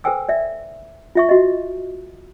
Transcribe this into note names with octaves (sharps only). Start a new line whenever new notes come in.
A4 B4 C5 G5 G#5 E6
D5 E5
F4 E5 C#6
F#4 D#5